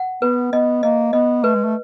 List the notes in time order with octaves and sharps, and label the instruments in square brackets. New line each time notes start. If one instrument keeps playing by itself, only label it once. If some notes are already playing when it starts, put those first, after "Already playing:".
Already playing: [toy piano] F#5
[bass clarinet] B3 [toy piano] B4
[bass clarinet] B3 [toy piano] D#5
[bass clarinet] A#3 [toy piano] D#5
[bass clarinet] B3 [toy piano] D#5
[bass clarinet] A3 [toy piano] B4
[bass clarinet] G#3
A3